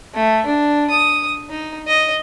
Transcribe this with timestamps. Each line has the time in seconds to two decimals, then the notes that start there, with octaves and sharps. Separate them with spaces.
0.14 A3
0.46 D4
0.90 D#6
1.49 D#4
1.87 D#5